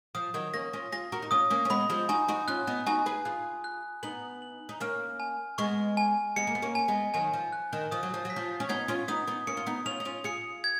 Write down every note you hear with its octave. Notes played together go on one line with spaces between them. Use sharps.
F3 D#6
D#3 F#3
A#3 C#4 A#6
C#4 F4
F4 G#4 A#6
F#4 A#4
D#4
C#4 F4 D#6
A#3 C#4
C#4
G#3 B3 B5
F3 G#3
D#4 F#4 G#5
D#4 F#4
C#4 F4 F#6
B3 D#4
D#4 F#4 G#5
G#4 B4
F4 G#4 F#6
F#6
B3 D#4 F#7
F#7
D#4
A#3 C#4 F6
G#5
G#3 B3 C#6
G#5
G#3 B3 C#7
A#3
B3
A#3 C#4
G#5
G#3 B3
D#3 F#3 G#5
F3
F#6
D#3
F3 D#6
F#3
F3
F#3 B6
F3
C#4
B3 D#4 G#6
C#4 F4
B3 D#4 D#6
B3 D#4
A#3 C#4 C#7
F4
B3 D#4
C#4 F4 F7
D#4
C#4 F4
F4 G#4 C#7
G#6